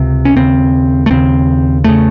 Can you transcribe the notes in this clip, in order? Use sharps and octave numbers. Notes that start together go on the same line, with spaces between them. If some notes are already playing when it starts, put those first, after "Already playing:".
Already playing: C#2 C3
C#4
D#2 C#3 C4
A3
D#2 C#3 C4
E2 C#3 A3